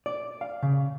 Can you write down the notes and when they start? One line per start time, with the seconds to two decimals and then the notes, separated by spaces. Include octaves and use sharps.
0.06 D5
0.41 F5
0.63 C#3